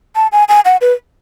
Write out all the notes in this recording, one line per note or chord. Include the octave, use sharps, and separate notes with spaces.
A5
G#5
G#5
F#5
B4